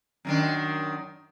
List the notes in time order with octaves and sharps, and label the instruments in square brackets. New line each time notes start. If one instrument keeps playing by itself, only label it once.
[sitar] F#2 D#3 D4